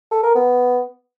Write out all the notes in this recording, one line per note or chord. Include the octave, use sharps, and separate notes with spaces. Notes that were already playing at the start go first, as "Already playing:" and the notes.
A4
A#4
B3